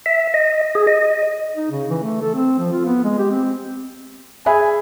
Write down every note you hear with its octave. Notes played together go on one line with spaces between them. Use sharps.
E5
D#5
G#4
D#5
D#4
C#3
E3
A3
A4
C4
F3
F4
B3
G#3
G4
C4
G#4 E5 G#5 B5